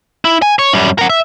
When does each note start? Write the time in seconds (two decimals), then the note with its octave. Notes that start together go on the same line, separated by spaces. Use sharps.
0.25 E4
0.42 G#5
0.59 C#5
0.74 F#2 G3
0.99 A#4 F#5
1.10 E5